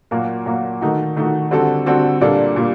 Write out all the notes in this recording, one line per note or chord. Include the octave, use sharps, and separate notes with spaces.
A#2 F#3 A#3 F#4
A#2 F#3 A#3 F#4
D#3 A3 D#4 F#4
D#3 A3 D#4 F#4
D3 G3 C4 F#4 A4
D3 G3 C4 F#4 A4
A#2 G3 A#3 D4 A4
A#2 G3 A#3